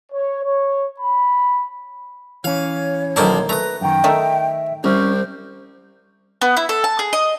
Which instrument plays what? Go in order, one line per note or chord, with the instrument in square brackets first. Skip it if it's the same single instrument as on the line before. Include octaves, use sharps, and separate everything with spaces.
[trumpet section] C#5
C#5
B5
[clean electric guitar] E3 C#4 [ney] C#5 [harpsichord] F5
[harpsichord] B1 C5 A5 [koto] D#3 A#3 E4
[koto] A3 [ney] B4 [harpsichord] A#5 D#6
[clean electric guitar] F#2 D#3 [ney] G5
[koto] D#3 A3 D#4 [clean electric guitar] E5
[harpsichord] C2 [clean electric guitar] C#4 [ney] C5
[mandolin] B3
E4
A4
A5
G#4
D#5